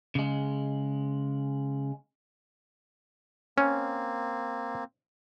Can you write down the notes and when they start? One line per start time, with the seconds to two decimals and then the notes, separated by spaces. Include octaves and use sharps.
0.15 C#3 G#3
3.58 A#3 C4 C#4